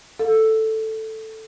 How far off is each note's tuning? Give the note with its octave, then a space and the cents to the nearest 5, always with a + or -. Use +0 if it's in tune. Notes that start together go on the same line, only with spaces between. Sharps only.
A4 +0 F5 +25